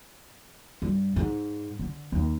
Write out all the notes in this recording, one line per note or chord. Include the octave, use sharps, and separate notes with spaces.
G2
G#2
D3
D#2